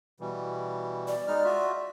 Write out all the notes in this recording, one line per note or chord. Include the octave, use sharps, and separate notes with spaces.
B2 E3 G3
D5
G#3 D#4 F6
F4 F#4 E5